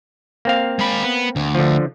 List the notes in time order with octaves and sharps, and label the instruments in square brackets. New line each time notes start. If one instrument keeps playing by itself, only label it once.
[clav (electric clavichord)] A#3 C4 F5
[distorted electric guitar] G#3 B5
B3
D2
[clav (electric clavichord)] D3 F3